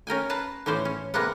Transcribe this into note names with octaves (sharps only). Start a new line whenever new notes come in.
C#4 A#4 G5 G#5
B4 F5 A5 A#5
A2 E3 C#4 C5 D5
C#4
C3 G#3 A#3 B3 F#5